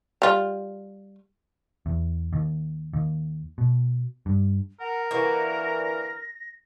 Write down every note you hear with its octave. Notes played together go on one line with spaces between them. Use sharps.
G3 F4
E2
D#2
D#2
B2
G2
A#4 F#5
D3 E3 A#3 F#4 A#6